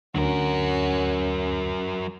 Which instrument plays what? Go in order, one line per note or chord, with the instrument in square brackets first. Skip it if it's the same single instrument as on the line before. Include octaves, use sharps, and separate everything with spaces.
[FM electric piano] D2 [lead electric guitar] F#3 A#4 [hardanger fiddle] C#4 F#4